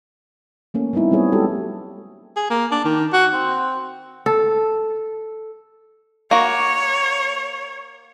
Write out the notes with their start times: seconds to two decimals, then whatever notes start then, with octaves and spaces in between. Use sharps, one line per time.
0.74 A3 A#3 C#4
0.93 G3 B3 C4 D#4 E4
1.11 F#3 G3 B3 G#4 C#5
1.32 G#3 F#4 G4 A4
2.36 G#4
2.50 A#3
2.72 D4
2.85 D#3
3.13 F#4
3.34 C4
4.26 A4
6.31 A#3 F#4 C#5